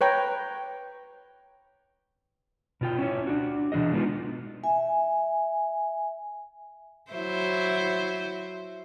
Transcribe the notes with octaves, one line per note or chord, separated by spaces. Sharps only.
B4 C#5 G5 A#5
B2 F4 G5
C#4 E4 C#5
D4 F#4
B2 E3 D4 G#4 D#5
F#3 G#3 B3 D#4 F4 F#4
E5 G#5
F#3 E4 C5